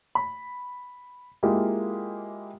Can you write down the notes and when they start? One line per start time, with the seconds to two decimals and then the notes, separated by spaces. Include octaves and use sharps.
0.15 B5
1.43 G#3 A#3 E4 F4 G4